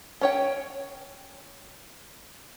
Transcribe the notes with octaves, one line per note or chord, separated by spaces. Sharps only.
C#4 C#5 G5